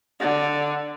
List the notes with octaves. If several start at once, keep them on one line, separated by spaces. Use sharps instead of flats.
D3